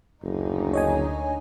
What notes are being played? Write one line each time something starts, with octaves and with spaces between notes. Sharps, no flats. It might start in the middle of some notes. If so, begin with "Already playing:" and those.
F#1 D2 D3 D#4
C#5 D#5 G#5